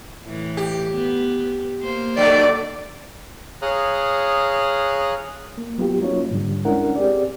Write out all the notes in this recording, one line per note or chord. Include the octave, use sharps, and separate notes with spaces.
A2 E3
G4
B3
A#3 C5
D3 F#3 A3 D5
G#4 C#5 F5 A#5 D#6 F#6
A#3
F#3 B3 F4 G4
F#3 A#3 C#4 D#4 F4 C#5
G#2 D3 G3
G#3 C#4 D4 E4 A#4 F#5
C4 G4 G#4 D5